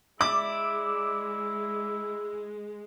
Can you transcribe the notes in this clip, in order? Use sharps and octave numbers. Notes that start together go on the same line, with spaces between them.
G#3 E4 D5 E5 D6